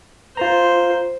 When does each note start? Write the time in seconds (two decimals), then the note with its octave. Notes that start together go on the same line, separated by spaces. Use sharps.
0.37 F4 C5 A#5